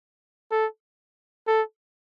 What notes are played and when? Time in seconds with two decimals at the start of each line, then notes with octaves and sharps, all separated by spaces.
0.51 A4
1.47 A4